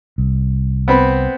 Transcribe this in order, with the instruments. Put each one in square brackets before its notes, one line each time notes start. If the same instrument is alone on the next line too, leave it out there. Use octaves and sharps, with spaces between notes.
[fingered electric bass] C2
[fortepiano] B3 C4 B5